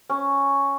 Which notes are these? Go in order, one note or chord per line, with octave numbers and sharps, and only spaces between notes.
C#4